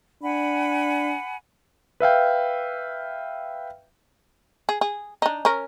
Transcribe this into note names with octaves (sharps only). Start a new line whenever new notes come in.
D4 F#5 G#5 B5
B4 E5 F5 G5
G#4
G#4
D4 D#4
C#4 A#4